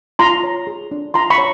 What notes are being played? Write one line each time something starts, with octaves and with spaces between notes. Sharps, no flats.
F4 A#5 C6
C#5
G#4
D4
F4 A#5 C6
B5 C#6
C#5